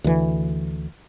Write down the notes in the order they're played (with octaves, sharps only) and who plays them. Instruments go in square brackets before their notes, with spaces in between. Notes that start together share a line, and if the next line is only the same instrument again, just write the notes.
[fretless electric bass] D2 E3